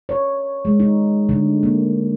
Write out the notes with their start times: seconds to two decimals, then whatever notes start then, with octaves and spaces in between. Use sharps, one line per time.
0.09 C#5
0.65 G#3
0.80 D#4
1.29 D3
1.63 A#3